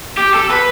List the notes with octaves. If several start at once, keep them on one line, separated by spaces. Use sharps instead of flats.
G4
A4
B4